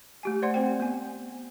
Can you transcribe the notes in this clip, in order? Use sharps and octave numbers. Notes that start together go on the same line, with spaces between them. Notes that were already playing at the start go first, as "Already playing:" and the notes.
A3 G4 G#5
C5 D5 F#5 C6
C4 C5 G5
B3 G#5